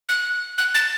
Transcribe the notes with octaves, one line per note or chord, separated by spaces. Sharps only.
F#6
F#6
A6